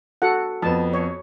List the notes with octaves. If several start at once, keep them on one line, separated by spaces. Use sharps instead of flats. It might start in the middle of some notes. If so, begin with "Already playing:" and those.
F#4 A4 F#5
F2 B3 A5
C#5